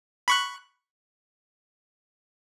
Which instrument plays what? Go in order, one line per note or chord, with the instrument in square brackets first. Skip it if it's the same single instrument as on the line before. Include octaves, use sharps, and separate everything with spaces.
[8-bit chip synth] B5 C#6 F#6